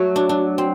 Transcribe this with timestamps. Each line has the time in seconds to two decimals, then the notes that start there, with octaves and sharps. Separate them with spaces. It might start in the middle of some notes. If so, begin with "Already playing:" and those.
Already playing: F#3 A3
0.16 D4
0.29 D4
0.58 C4